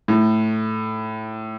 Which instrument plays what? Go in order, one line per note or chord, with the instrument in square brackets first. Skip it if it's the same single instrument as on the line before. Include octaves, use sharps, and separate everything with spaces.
[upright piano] A2